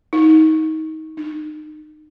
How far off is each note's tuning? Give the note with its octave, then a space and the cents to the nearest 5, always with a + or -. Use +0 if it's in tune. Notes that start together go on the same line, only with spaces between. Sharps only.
D#4 +25
D#4 -30